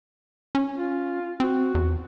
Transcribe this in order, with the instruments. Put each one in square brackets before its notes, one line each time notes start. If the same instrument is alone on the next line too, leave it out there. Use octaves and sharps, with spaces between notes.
[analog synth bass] C#4
[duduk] F4
[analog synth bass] C4 [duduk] F#4
[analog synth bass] E2